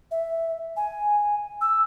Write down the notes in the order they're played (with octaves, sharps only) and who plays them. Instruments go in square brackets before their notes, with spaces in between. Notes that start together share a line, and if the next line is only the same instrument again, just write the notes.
[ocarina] E5
G#5
E6